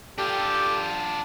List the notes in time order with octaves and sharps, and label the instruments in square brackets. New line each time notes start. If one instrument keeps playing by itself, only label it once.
[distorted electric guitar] D4 F4 [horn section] G4 A4